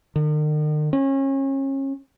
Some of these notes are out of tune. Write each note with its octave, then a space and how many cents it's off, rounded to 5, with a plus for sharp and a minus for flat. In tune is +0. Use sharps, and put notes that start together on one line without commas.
D#3 -45
C#4 -30